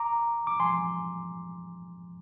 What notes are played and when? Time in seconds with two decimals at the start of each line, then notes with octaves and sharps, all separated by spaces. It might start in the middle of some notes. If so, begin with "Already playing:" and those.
Already playing: A#5 D6
0.47 D6
0.60 G#5 C6